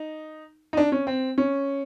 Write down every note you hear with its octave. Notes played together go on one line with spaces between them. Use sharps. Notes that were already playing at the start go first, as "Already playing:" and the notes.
Already playing: D#4
D#4
D4
C#4
C4
C#4